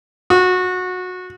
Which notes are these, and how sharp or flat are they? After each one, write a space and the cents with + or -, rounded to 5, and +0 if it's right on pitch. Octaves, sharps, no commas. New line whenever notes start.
F#4 -20